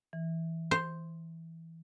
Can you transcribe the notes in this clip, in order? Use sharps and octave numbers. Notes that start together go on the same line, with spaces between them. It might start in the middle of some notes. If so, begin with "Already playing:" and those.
E3
C5